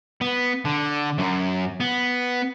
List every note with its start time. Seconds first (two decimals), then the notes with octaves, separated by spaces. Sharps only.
0.21 B3
0.65 D3
1.18 F#2
1.80 B3